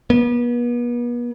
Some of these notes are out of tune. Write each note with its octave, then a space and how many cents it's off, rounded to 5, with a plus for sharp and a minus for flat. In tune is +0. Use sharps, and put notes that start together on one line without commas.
B3 -40